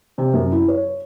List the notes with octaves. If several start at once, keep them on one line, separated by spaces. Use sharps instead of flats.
C3
F#2
E4
C#5